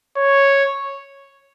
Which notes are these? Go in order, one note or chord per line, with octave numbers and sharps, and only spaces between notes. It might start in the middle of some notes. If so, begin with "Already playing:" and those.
C#5